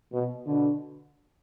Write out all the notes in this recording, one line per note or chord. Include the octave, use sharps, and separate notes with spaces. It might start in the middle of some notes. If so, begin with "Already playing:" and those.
B2
B2 D3